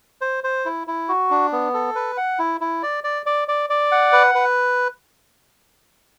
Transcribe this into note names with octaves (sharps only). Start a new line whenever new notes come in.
C5
C5
E4
E4
F#4
D4
B3
A4
B4
F#5
E4
E4
D5
D5
D5
D5
D5
F#5
B4
B4